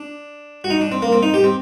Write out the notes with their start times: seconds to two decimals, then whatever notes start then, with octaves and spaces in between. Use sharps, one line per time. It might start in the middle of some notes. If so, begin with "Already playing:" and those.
Already playing: D4
0.64 F#4
0.70 D#4
0.81 D4
0.92 C4
1.02 A#3
1.12 C4
1.23 D#4
1.34 G4
1.44 C4